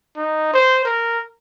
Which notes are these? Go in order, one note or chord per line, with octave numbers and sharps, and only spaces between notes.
D#4
C5
A#4